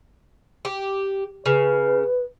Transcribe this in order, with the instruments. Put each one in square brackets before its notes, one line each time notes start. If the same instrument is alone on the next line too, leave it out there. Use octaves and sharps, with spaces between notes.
[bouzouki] G4
[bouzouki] C#3 [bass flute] B4